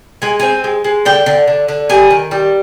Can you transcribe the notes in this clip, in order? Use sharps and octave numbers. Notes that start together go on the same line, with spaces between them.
G#3 G#5
C4 G#5
G#3
G#3
D3 G5
D3
D3
D3
G3 G#5
D#3
G3